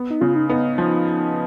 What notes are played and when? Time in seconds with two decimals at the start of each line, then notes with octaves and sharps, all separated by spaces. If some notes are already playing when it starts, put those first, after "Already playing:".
Already playing: B3
0.10 D#4
0.21 C#3 F4
0.36 D#4
0.49 B3 D#4
0.78 F3